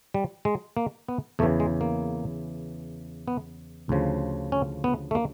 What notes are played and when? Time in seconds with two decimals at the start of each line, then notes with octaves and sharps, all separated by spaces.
0.14 G3
0.45 G#3
0.77 A#3
1.08 B3
1.39 E2 C#3 E3 A3
1.60 G#3
1.81 A#3
3.28 B3
3.89 D2 C#3 F3
4.52 C#4
4.84 B3
5.11 A3
5.15 A#3